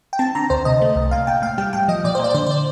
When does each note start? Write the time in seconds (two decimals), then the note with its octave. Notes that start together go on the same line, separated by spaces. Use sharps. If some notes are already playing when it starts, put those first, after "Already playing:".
0.13 G5
0.19 C4 A5
0.35 D3 A#5
0.50 D2 C5
0.65 C3 D#5
0.82 A3
0.96 C2
1.11 A#2 F5
1.27 A#2 G5
1.42 A2 F5
1.58 G3 G5
1.73 A2 G5
1.88 F3 D#5
2.04 A#2 D5
2.15 C5
2.20 A#2 D5
2.30 D5
2.34 D3 C5
2.46 C5
2.51 D5